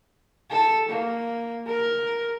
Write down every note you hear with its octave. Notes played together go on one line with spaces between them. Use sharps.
A4
A#3
A#4